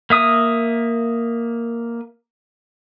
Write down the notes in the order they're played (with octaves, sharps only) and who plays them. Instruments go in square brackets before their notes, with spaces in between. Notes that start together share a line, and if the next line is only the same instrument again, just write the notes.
[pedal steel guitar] A#3 E5 D#6